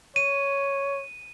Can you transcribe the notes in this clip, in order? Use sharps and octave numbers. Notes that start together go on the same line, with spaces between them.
C#5 D#7